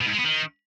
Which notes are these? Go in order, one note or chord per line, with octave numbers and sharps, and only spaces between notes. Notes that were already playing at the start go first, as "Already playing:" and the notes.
B2
G#2
G#3
B3
D#3